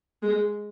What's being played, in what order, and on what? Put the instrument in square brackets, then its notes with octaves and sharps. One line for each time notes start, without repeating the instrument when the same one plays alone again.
[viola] G#3